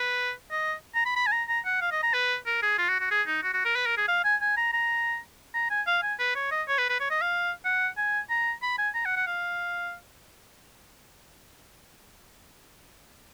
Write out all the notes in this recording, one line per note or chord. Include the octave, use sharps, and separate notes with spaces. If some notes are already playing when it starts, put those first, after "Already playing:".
Already playing: B4
D#5
A#5
B5
B5
G#5
A#5
A#5
F#5
F5
D#5
A#5
B4
A#4
G#4
F4
F#4
F#4
G#4
D#4
F#4
F#4
A#4
B4
A#4
G#4
F5
G#5
G#5
A#5
A#5
A#5
G#5
F5
G#5
B4
C#5
D#5
C#5
B4
B4
C#5
D#5
F5
F#5
G#5
A#5
B5
G#5
A#5
F#5
F#5
F5